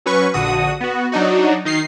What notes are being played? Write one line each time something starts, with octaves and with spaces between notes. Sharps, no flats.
F#3 C#4 B4 C#6
A#1 D3 F#4 D#6
B3 F#4
F#3 D4 D#4 F#4
D#3 D#4 C7